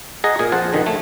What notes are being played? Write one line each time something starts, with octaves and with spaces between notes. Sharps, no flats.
G#4 D#5 F#5 A#5
A#2 G#4
A#1 F2 C5 F#5 A5
A#1 D3 D#3
A3